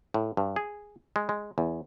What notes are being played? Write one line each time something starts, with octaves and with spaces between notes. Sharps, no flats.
A2
G2
G#4
G#3
G#3
E2